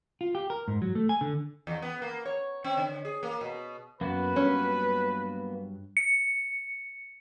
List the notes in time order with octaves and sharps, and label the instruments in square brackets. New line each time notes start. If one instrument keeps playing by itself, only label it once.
[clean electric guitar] F4
G4
A#4
G#2
F#3
A3
G#5
D3
[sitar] E2
B3
A#3
C#5
C4
D3
G#4
A#3
B2
[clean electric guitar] F#2 [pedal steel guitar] A#3 B3 F#4 [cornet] B4
[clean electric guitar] G2 F#3 [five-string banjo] C#4
[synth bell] C#7